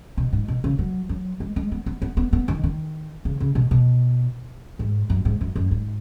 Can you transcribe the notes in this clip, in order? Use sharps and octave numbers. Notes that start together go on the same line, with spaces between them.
B2
G#2
B2
C#3
F#3
F#3
G#3
G#3
B3
B3
B3
B3
B3
D#3
D#3
C#3
C#3
B2
B2
G#2
F#2
G#2
F#2
F#2
G#2